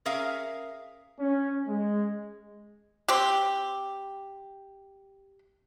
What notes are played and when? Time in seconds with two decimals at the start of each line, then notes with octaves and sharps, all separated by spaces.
0.06 C#4 G#4 A#4 E5 F5
1.20 C#4
1.68 G#3
3.08 C4 G4